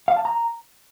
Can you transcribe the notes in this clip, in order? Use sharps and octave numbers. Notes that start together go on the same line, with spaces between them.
F5
A5
A#5